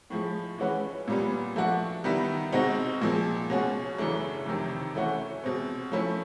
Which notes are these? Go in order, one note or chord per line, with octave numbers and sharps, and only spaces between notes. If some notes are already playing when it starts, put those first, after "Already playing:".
A2 F3 G#3
E3 G#3 C#4 F#4 B4
A#2 G3 B3
F3 A3 D4 F#4
D#3 G3 B3 E4
B2 G#3 C4 D#4 F#4
A#2 F3 G#3
B2 G#3 C#4 F#4
F#2 C#3 E3 A3 D4
F2 C3 D#3
E3 A3 C#4 F#4
B2 G#3 C4
F3 A3 C#4 E4